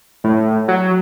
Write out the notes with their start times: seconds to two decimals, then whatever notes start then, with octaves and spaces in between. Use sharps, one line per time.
0.24 A2
0.68 F#3